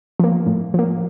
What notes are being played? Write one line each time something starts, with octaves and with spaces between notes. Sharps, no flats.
F3 A#3
A2
F3 A#3